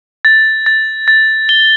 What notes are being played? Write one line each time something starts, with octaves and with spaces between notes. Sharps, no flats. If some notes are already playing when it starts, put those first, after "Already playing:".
A6
A6
A6
G7